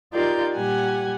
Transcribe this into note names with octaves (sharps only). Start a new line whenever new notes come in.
D#4 F4 G4 A#4 D5 G6
A#2 G3 G4 F#5 G#5 G#6